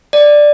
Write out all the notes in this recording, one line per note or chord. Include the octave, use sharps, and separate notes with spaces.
D5